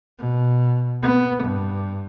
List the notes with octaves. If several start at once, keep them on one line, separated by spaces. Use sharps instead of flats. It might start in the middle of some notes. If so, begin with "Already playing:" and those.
B2
B3
G2